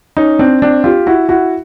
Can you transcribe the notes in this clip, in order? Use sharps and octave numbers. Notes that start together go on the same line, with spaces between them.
C#4 D#4
C4 D4
C4 D4
F4 G4
E4 F#4
E4 F#4